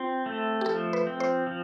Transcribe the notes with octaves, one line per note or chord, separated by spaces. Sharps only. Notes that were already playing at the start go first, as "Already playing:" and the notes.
Already playing: C4 F4
A3
G4
F3 A4
B4
C4
C5
F3